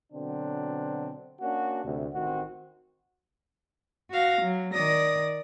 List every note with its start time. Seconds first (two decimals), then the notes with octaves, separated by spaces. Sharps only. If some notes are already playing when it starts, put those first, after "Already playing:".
0.13 B2 D3 F#3 C4 D4
1.41 A#3 C#4 D4 F#4
1.85 D2 C3
2.14 A1 D#3 C4 F#4
4.11 F#4 F5 A#6
4.43 F#3
4.73 D#3 D5 D#6 A#6